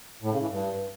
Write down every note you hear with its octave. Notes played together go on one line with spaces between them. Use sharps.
A2
C#3
E3
G2